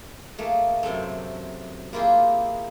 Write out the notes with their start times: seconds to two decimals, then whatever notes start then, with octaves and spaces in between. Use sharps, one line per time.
0.39 A3 A#3 G#4
0.83 F#2 C3 F#3 A3
1.93 A#3 E4 F4 G4 G#4